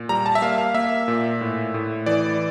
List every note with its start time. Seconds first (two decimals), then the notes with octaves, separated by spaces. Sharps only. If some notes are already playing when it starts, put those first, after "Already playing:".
Already playing: A#2
0.09 G3 A#5
0.26 A5
0.35 E5
0.42 A#3 F5
0.58 F5
0.74 A#3 E5
1.08 A#2
1.41 A2
1.74 A2
2.06 E3 D5